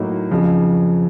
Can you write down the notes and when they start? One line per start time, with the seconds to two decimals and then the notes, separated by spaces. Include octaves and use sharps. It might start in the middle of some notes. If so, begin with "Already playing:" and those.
Already playing: A2 F#3 A#3 D#4 F#4
0.31 F2 C#3 F3